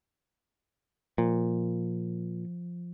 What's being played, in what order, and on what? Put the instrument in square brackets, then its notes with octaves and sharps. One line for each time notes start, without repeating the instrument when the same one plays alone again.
[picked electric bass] A#2 [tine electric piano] F3